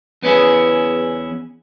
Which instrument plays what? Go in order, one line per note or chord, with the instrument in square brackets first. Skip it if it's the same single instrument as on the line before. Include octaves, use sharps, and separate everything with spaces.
[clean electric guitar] E2 B3 C#4 E4 G#4